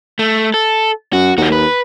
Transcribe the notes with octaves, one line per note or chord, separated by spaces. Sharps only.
A3
A4
F#2 F#4
D#2 A#3 F#4
B4